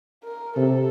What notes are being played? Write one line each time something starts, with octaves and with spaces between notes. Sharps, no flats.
A#4
C3 A4